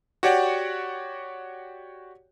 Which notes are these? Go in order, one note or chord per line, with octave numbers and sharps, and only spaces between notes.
F#4 G4 C#5 D5 F#5 G5